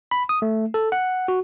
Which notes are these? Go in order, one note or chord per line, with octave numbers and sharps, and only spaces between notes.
B5
D#6
A3
A4
F#5
F#4